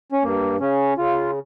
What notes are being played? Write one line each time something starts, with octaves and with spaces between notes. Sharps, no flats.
C#4
G2 A#3
C#3 C#4
C#3 F4